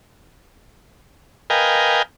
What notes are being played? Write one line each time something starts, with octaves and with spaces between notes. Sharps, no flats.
A#4 B4 D#5 F5 G5 G#5